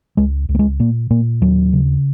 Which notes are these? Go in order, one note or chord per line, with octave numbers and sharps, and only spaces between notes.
C#2 G#3
C#2
A#3
G#3
A#2 A#3
A#2 A#3
D#2 F#3
C#3